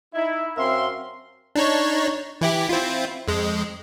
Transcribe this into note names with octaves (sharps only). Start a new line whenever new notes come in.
D#4 E4
F#2 C4 A#4 E5 F5 C6
D4 D#4 C#5
E3 E4 G4
C4 E4 F4
F2 G#3